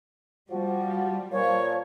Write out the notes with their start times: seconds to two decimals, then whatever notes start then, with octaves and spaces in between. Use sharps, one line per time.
0.51 F3 G3 F#4
1.32 A#2 F3 C#5